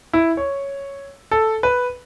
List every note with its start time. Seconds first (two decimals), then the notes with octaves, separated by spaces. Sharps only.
0.13 E4
0.37 C#5
1.31 A4
1.63 B4